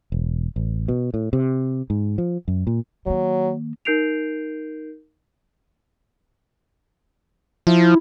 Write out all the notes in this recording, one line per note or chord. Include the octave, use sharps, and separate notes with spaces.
E1
A1
B2
A2
C3
G#2
F3
F#2
A#2
D#3 F#3 A#3
D#4 A#4 G6 C7 D7 F7
F3 E4